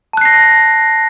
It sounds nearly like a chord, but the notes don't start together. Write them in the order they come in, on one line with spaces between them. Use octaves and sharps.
A5 F#6 C7 A#6